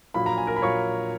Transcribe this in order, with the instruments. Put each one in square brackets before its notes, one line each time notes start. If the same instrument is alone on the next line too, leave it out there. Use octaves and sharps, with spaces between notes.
[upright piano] A#1 A#2 F#3 A#3 B5
A#5
G#5
A#4 A#5
B5
A#2 F#3 A#3 C#5 C#6